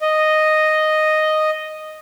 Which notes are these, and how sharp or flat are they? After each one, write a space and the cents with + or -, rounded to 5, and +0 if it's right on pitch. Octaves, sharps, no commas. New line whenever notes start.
D#5 -5